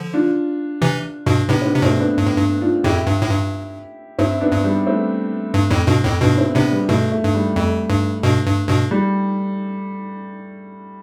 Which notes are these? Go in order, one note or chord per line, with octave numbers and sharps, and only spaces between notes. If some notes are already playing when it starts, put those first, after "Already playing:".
Already playing: D3 F3
D4 F4
C3 E3
G2 B2
A2 C3 B3 D4
C4
B3 D4
C3
G2 B2 A3 C4
B3 D4
G2
A2
G2
D4 F4
F2 A2 E4 G4
G2
A2
G2
G2 C4 E4
B3 D4
G2
G3 B3
A3 C4
G2
F2 A2
G2 B2
F2 A2
G2 B2 B3 D4
C4 E4
A2 C3 B3 D4
G3 B3
G2 B2 A3
A3
G2
G3
F2 A3
G2
G2 B2
G2
G2 B2
G3